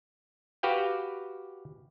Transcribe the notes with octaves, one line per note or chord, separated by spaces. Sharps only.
F#4 G4 B4 F5 G5